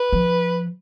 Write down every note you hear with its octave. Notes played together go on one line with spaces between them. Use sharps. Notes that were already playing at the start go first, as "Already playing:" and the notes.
Already playing: B4
F3